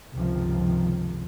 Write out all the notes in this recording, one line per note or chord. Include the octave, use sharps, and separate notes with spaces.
G1 C#2 C3 D#3 F3